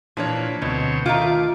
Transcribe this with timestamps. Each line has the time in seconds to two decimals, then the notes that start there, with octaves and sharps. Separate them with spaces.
0.17 A#2 E3 F3 D4 C#5
0.62 D2 B2 C4 C#5
1.06 D#3 A3 F4 D6